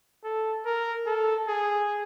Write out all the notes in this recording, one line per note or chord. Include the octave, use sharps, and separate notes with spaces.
A4
A#4
A4
G#4